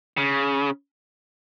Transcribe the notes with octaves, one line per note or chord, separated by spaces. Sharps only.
C#3